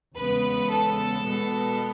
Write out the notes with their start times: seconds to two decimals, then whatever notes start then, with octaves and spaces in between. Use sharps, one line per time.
0.16 E2 C#3 G#3 B3 B4
0.71 A4
1.24 B2 G#3 B3